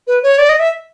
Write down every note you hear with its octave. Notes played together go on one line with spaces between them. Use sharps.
B4
C#5
D5
D#5
E5